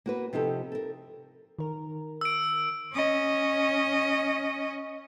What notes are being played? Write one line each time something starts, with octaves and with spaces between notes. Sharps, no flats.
A#3 F#4 B4
C3 F3 D#4 G4 A4
A4 A#4
D#3 A#4
E6 D7
C#4 D#5